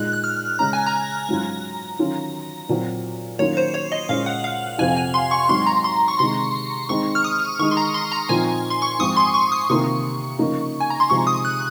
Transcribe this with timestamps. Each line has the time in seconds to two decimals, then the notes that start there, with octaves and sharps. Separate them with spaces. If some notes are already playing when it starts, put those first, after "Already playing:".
Already playing: A#2 G#3 D#4 F#6
0.13 F#6
0.24 F6
0.59 C#3 G#3 C#4 A#5
0.73 G#5
0.86 A#5
1.29 G#2 F#3 C#4 F4
1.99 D#3 F#3 C#4 F4
2.69 A#2 F#3 C4
3.39 D#3 F#3 A#3 C#4 F4 C#5
3.57 C5
3.74 C#5
3.92 D#5
4.09 A#2 G#3 C#4 F4 F5
4.26 F#5
4.44 F5
4.78 F2 C3 F3 C4 G#5
4.96 G#5
5.14 C6
5.31 C#6
5.49 G#2 F#3 C4 D#4 C6
5.66 A#5
5.84 C6
6.08 C#6
6.19 C3 D#3 G#3 C6
6.89 D#3 G#3 C4 D#4 C#6
7.15 F6
7.24 D#6
7.59 D#3 G#3 D#4 C#6
7.71 C6
7.77 A#5
7.94 C6
8.12 A#5
8.29 A#2 F3 C4 D#4 G#5
8.70 C6
8.82 C#6
8.99 G#2 F3 C4 F4 D#6
9.17 C6
9.34 C#6
9.52 D#6
9.69 C3 D#3 A#3 F4 C#6
10.39 C#3 F3 A#3 D#4
10.80 G#5
10.90 A#5
11.00 C6
11.10 C3 F3 G#3 D#4 C#6
11.27 D#6
11.45 F#6